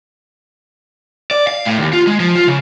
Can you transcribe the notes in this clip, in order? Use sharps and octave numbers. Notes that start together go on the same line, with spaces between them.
D5
F5
A2
D#2
F4
G#3
F3
F4
C#3